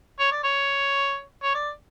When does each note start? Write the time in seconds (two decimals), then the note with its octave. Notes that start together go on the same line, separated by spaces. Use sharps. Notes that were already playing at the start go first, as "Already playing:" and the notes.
0.20 C#5
0.32 D5
0.44 C#5
1.43 C#5
1.54 D5